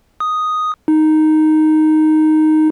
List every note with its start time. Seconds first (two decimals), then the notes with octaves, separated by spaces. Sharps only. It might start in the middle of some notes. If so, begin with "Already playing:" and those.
0.20 D#6
0.88 D#4